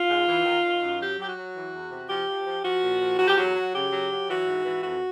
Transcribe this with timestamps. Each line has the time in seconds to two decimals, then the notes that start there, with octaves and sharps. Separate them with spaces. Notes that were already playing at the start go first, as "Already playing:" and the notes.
Already playing: F4
0.08 G#2
0.26 E3
0.45 D#3
0.62 D#3
0.81 F#2
0.99 F#3 G4
1.17 F#3 G4
1.27 F#4
1.35 F#3
1.54 E3
1.72 E2
1.90 C3
2.08 F3 G4
2.27 F3
2.46 F3
2.63 F3 F#4
2.82 A#2
3.00 F3
3.19 E2 F#4
3.28 G4
3.37 F#3 F#4
3.56 F#3
3.73 C#3 G4
3.92 F#3
4.11 F#3
4.28 E3 F#4
4.46 G#2
4.64 E3
4.83 F2 F#4